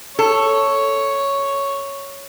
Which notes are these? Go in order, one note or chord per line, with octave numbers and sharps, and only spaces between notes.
A4 C#5